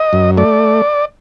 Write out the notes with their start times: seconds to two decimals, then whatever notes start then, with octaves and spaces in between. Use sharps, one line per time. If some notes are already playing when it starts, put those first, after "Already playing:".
Already playing: D#5
0.13 F#2
0.37 A3 D5